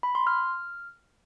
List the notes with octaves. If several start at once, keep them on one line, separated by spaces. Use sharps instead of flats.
B5
C6
F6